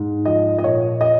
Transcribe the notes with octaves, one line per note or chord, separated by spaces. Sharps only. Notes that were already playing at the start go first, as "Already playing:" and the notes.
Already playing: G#2
F3 D#5
D#5
A#2 C#5
D#5